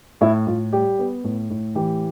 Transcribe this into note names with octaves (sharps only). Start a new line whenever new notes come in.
A2 E4
A2 F4
G3 G4
B3
A2
A2
E3 G4